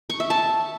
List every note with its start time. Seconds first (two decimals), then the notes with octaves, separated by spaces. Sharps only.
0.10 C#6
0.20 E5
0.30 A5